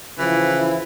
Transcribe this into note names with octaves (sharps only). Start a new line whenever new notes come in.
C#3 E3 F3 E4